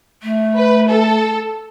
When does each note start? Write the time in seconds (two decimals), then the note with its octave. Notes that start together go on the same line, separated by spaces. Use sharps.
0.23 A3
0.57 B4
0.89 A4